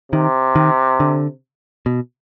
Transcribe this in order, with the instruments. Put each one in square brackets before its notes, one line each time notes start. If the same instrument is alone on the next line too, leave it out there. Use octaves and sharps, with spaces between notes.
[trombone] C3 [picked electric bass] D#3
[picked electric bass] D#3
D3
B2